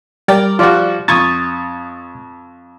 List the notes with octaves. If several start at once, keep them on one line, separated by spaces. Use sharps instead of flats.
G3 A#4 D5 G5
F3 G3 F4 F#4 D5
F2 C#6 D#6 G#6 A6